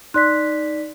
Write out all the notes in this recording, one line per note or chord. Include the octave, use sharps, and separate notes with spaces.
D#4 D5 C6 F#6 B6